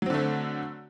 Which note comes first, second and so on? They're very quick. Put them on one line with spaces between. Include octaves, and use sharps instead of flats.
F#3 C4 D3 A3